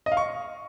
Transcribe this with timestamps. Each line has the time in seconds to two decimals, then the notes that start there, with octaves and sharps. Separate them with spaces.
0.06 D#5
0.12 F5
0.17 C#6